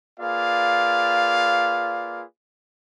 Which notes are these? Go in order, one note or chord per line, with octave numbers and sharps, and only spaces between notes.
A#3 F4 G#4 B4 D5 F5